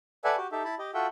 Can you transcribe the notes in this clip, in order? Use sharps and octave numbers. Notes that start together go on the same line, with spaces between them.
A4 B4 D5 E5 F#5 G#5
F#4 G4
D#4 G4 A4 E5
E4 A5 B5
G4 D#5
F4 F#4 A4 E5 F#5 G5